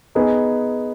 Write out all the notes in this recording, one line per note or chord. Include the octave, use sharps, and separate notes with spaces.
B3 D#4 G#4